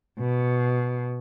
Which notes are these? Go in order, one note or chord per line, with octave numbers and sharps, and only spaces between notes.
B2